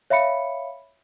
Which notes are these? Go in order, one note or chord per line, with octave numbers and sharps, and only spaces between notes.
C#5 E5 F5 B5 C#7